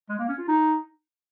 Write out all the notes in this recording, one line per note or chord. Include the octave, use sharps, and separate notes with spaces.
G#3
A#3
C#4
F4
D#4